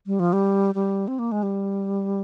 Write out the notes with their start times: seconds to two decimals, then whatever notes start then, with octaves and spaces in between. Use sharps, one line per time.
0.07 G3
0.20 F3
0.33 G3
0.75 G3
1.08 C4
1.19 A#3
1.32 G#3
1.43 G3